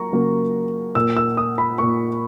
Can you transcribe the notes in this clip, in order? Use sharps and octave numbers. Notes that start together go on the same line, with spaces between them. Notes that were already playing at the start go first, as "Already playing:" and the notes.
Already playing: F#3 A#3 A#5 C#6
C#3 F#3 A#3
A#2 A#3 E6
E6
D#6
B5
A#2 A#3 C#6